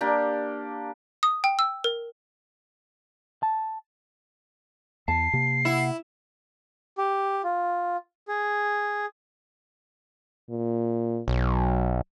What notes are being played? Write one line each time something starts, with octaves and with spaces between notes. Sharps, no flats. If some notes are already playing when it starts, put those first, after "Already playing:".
A#3 D4 G4
D#6
G5
E6
A#4
A5
E2 A5 C7
C3 A#3
E4 F#5
G4
F4
G#4
A#2
B1 F#3